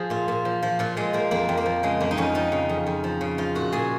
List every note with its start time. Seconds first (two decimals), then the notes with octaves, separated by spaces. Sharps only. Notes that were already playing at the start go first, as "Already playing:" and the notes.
Already playing: F3 G#4
0.10 A#2 F4
0.28 A#2
0.45 F3
0.63 F3
0.79 A#2 F4
0.97 A#2 G#3
1.13 F3 A#3
1.31 F2 A#3
1.49 F2
1.57 A#3
1.66 F3
1.83 C#3 G#3
2.00 F2 A#3
2.11 D#4
2.18 F2 C#4
2.34 F3 D#4
2.52 C#3
2.69 F2
2.87 F2
3.04 F3
3.21 C#3
3.38 F3 F4
3.55 A#2 F#4
3.72 A#2 G#4